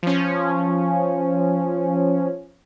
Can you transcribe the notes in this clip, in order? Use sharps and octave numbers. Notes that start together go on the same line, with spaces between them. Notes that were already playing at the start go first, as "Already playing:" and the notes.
F3 C#4